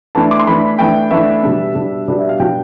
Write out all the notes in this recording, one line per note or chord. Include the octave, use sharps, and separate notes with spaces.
E3 A3 D4 A5
D6
C6
E3 A3 D4 B5
E3 A3 D4 G5
E3 A3 D4 E5
B2 G3 D4
B2 G3 D4
B2 G3 D4 D5
E5
F5
B2 G3 D4 G5